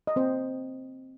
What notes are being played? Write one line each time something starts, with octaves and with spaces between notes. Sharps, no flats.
D#5
A#3 C4 C5